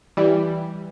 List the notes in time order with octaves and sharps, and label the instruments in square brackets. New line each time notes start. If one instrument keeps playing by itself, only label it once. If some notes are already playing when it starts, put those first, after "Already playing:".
[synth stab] E3 G3